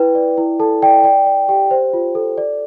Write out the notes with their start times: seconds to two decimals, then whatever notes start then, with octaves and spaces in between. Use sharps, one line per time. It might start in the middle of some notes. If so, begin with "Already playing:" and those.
Already playing: E4 B4 G5
0.15 D5
0.38 E4
0.60 A4 A5
0.82 D5 G5
1.04 D5 G5
1.26 D5
1.48 G4 G5
1.71 C5
1.93 F4
2.15 A4
2.38 D5